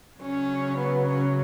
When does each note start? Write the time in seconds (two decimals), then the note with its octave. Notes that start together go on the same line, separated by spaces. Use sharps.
0.20 C#3 F#3 C#4
0.78 B3
1.06 C#4